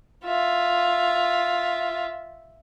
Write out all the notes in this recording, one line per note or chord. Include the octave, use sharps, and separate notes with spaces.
F4 E5